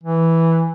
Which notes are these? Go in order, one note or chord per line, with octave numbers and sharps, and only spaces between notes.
E3